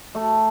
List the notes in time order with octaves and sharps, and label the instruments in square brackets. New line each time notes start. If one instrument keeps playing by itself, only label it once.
[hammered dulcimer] A3